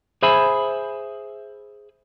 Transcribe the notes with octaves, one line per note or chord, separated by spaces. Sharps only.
G#4 C5 E5 G#5 B5